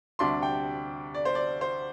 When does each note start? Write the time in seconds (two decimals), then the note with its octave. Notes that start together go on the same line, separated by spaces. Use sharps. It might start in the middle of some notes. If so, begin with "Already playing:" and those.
0.19 D2 C3 G3 D4 C6
0.42 G5
1.14 D5
1.25 C5
1.35 D5
1.61 C5